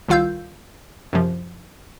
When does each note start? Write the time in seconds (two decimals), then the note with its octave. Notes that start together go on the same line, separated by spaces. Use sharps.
0.08 C2 D#3 F4 F5 E6 G6
1.13 F#2 C3 F3